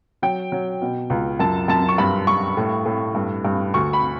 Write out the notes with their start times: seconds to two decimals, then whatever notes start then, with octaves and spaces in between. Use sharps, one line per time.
0.22 F#3 G5
0.52 F#3
0.82 B2
1.10 C#2
1.39 F#2 A5
1.68 F#2 A5
1.88 C#6
1.98 G2 B5
2.27 G2 C#6
2.57 A2
2.85 A2
3.15 G2
3.45 G2
3.74 D2 C#6
3.93 B5